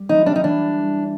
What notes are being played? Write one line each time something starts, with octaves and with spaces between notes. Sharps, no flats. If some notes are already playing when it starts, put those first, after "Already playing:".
Already playing: G3
E3 D#4
G3 D4
D#4
E3 D4